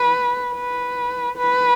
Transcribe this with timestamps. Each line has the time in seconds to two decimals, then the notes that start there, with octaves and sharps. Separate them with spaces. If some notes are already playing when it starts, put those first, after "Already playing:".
Already playing: B4
0.53 B4
1.37 B4